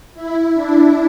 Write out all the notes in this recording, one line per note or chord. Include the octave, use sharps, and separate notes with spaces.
E4
D4